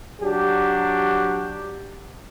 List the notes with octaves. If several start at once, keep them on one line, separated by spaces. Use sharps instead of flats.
F#3 D4 G4